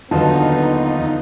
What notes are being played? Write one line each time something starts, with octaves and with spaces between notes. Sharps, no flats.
D#2 D3 D#3 F#3 B3 D#4 F4 A5